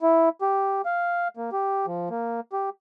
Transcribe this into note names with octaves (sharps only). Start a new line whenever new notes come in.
E4
G4
F5
A#3
G4
F3
A#3
G4